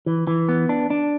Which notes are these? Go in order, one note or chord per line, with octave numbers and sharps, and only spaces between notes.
E3
E3
B3
D4
D4